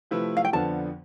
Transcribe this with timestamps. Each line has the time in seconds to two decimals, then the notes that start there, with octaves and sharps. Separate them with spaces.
0.11 C3 F3 A3 E4 B4
0.37 F5
0.45 G5
0.53 F2 D3 F3 B3 D4 A5